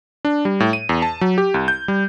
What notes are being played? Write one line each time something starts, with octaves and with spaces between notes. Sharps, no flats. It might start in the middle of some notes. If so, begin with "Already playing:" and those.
D4
G3
A2
D#7
E2
A5
F#3
G4
C2
G6
G3